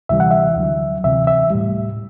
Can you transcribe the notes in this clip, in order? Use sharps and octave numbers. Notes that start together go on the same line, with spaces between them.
D2 C3 E3 G3 E5
F#5
E5
D2 D3 F#3
D2 C3 E3 E5
E5
A2 G3